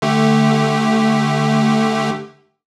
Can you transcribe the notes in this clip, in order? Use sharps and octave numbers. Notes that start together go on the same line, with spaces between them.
D3 A3 G4